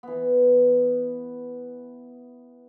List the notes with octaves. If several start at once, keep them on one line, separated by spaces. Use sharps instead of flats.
E3 B3